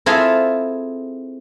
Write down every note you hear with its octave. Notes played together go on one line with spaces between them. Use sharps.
C4 E4 F4 G#4 A4 A#5